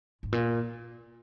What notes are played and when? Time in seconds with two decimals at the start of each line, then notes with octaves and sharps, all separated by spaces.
0.23 G#2
0.32 A#2